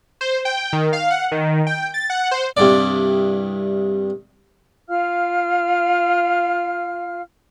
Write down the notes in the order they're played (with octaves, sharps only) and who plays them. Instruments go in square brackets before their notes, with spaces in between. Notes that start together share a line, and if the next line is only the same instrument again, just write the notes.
[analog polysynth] C5
G5
D#3
F5
F#5
D#3
G5
A6
F#5
C5
[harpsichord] C2 G2 D5
[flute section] F4 F5 F6